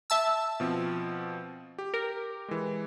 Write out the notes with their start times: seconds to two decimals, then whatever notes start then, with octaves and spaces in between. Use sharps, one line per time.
0.10 E5 A5 E6
0.60 B2 F3 C4
1.78 G4
1.94 A#4
2.48 E3 G#3